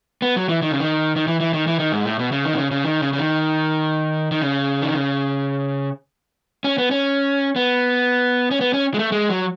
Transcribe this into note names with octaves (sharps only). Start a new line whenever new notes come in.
B3
F#3
E3
D#3
C#3
D#3
D#3
E3
E3
D#3
E3
D#3
G#2
A2
B2
C#3
D#3
B2
C#3
C#3
D#3
C#3
C#3
D#3
D#3
C#3
D#3
C#3
C#4
B3
C#4
B3
C#4
B3
C#4
G#3
A3
G#3
F#3